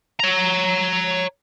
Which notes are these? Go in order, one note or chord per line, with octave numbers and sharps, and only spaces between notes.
C#5 A#5